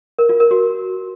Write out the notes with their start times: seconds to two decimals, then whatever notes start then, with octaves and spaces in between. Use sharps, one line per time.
0.19 A#4
0.29 F4
0.40 A#4
0.51 F#4